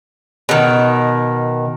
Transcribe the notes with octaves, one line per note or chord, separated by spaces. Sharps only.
B2 D#3